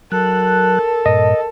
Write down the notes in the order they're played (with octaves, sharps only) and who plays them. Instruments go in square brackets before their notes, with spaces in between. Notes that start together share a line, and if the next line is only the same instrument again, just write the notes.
[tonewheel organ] F#3 F#6 [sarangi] A4 [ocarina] A#4
[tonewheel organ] G2 A#2 [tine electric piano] D#5